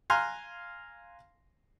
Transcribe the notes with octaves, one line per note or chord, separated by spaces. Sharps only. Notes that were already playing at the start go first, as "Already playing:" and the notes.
F5 G#5 A#5 C6 F6 F#6